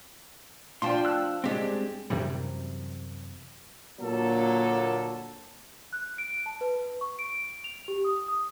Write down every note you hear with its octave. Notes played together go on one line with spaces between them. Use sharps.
F3 D4 F4 G5 A5 C6
E6 F#6
G2 G#3 C4 G4 D5
F#2 C3 E3 G3
A#2 D3 F#3 A#3 A4
F#6
D7
A5
B4
C#6
D7
F7
G4
D#6
D#6